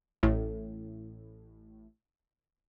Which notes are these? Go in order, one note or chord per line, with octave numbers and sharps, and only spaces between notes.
A1 A2